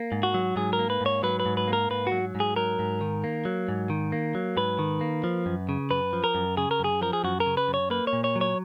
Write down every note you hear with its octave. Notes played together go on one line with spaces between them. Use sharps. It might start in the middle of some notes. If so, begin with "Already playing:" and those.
Already playing: A#3
G#2
F#4
F#3
G#2 G#4
A#4
A#3
B4
G#2 C#5
F#3 B4
B4
G#2
B4
A#3
A#4
G#2 B4
F#4
F#3
G#2
G#4
F#3 A#4
G#2
D#3
A#3
F#3
G#2
D#3
A#3
F#3
G#2 B4
D#3
A#3
F3
F#2
C#3
F#2 B4
F3
A#4
F#2
C#3 G#4
A#4
F#2 G#4
F3 A#4
G#4
F#2 F#4
A#4
C#3
B4
F#2
C#5
A#3 B4
C#5
A#2
C#5
F#3
C#5